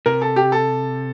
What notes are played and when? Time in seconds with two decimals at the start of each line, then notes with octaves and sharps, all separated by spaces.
0.06 C3 A#4
0.22 A4
0.36 G4
0.52 A4